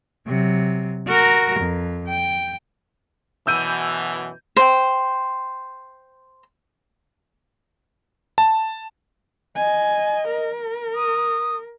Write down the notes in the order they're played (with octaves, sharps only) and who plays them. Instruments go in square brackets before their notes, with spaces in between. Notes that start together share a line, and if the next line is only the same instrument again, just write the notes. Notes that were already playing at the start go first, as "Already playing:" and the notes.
[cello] C3 F#3
F#4 A#4
F2
G5
[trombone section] F#2 B2 E3 [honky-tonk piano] E6 G6 D#7
[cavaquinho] C5 G5
[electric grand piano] A5
[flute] D#5 [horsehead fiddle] G#5
[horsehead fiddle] A#4
[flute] D#6